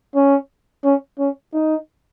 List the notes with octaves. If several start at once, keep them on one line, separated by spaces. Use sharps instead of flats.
C#4
C#4
C#4
D#4